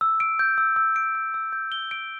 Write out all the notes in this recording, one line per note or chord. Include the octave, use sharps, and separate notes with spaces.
E6
D7
G6
E6
E6
D7
G6
E6
G6
G7
D7